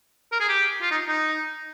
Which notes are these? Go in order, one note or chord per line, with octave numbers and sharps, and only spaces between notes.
A#4
G#4
G4
F4
D#4
D#4